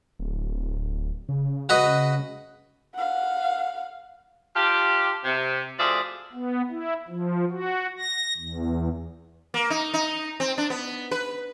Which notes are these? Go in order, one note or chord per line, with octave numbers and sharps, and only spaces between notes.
D1
C#3
F#4 B4 D#5
F5 F#5
D4 F4 G4
C3
D2 F3 G#4 D5 E5
B3
E4
F3
F#4
A#6
E2
A#3
D#4
D#4
C4
D4
B3
B4